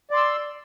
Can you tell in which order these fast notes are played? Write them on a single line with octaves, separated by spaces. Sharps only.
D5 C6 E6